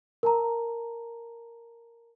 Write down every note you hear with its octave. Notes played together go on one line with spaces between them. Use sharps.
A#4 A5 A#5